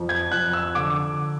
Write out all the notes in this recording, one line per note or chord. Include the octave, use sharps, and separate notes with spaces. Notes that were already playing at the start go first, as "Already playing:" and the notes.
Already playing: F2
G#6
F2 F#6
E6
D3 D6